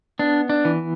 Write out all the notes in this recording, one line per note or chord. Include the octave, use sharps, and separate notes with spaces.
B3 D4
D4
E3